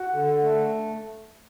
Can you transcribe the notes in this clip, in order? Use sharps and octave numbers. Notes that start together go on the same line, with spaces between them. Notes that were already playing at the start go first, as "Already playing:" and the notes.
Already playing: F#4
D3
A3